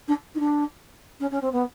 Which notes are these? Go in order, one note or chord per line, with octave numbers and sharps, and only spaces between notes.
D4
D#4
D4
C#4
C#4
C4
B3